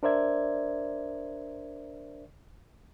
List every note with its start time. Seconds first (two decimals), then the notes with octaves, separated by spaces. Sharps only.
0.03 D4 A#4 C5 D5 E5 G#6